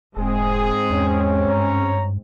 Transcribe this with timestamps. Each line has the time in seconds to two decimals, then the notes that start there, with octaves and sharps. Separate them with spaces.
0.17 E1 G#2 G#3 C4 G#4
0.90 E2 C#4
1.48 G2 C#5 A#5